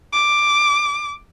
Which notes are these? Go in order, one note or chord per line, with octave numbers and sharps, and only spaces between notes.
D6